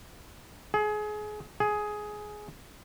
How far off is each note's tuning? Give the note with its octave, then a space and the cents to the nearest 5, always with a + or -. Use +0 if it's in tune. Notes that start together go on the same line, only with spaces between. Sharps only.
G#4 +25
G#4 +10